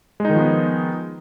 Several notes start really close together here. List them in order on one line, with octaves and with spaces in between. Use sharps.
G#3 D#4 D#3 F3 B3